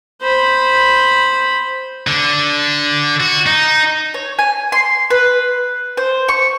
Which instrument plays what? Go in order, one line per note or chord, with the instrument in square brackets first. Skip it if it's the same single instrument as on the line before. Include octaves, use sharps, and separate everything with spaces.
[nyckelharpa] C5 B5
[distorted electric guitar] D3
F#4
D#4
[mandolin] C#5
G#5
C6
B4
C5
C#6